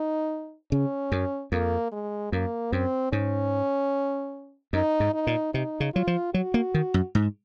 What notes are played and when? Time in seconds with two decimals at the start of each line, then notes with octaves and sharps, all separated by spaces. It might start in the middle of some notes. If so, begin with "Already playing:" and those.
Already playing: D#4
0.72 C#3 C#4
1.12 F#2
1.52 F2 A#3
1.92 G#3
2.32 F#2 A#3
2.72 F#2 C4
3.12 G#2 C#4
4.73 F#2 D#4
5.00 G#2
5.14 D#4
5.27 A#2
5.54 C3 D#4
5.80 C#3
5.94 F#3 F4
6.07 F3
6.34 F#3 F#4
6.54 A#3
6.74 D#3
6.94 F#2
7.15 G#2